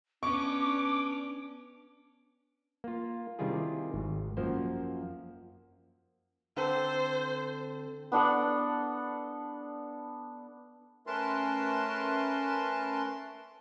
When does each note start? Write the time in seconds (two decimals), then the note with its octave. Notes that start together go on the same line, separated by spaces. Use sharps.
0.23 B3 C#4 D4 C#6 D6
2.84 A#3 F4
3.39 C3 D#3 G3 E4 F4 G#4
3.94 G#1
4.37 F#2 F3 A#3 C5
6.57 D3 C4 A4 C5
8.12 B3 D4 A4 F#5
11.07 A3 C#4 A#4 B4 A5 C6